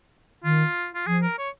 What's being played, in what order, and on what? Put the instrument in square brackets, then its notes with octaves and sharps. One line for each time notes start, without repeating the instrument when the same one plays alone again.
[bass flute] D#3 [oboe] F4
[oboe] F4
[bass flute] F3 [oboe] G#4
[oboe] A#4
C#5